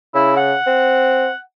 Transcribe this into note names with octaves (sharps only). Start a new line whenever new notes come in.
C#3 E4
F#5
C4